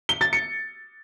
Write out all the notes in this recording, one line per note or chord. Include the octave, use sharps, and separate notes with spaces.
G7
A6
C#7